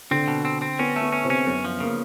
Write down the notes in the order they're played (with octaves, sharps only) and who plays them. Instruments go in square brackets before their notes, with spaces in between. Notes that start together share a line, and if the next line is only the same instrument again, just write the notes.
[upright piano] D3 D4 [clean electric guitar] C4
[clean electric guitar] B2
C4
C4
[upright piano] B3 [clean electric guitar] C#4
[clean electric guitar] A3
[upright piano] B3
[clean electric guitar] C#4
[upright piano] C3 C4
[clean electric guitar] C#4
[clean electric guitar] F#2 [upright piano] B3
[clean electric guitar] F3
[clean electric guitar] C#3 [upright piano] A#3